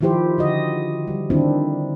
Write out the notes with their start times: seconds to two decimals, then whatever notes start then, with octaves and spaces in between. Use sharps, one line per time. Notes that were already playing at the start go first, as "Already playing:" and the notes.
0.01 D#3 F3 E4 G4 C5
0.38 D3 F#4 D#5
1.07 G3
1.30 D3 D#3 C4 D4 E4